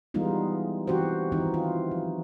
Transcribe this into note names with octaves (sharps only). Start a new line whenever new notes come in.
E3 G3 G#3 B3 D#4 F4
E3 C4 F#4 G4 C5
D#3 E3 C4 D#4
F4
F3